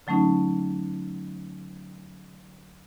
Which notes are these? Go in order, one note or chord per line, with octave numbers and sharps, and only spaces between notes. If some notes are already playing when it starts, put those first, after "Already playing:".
D3 F#3 A3 C#4 D#4